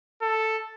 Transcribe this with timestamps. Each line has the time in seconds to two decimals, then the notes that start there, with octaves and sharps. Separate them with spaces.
0.22 A4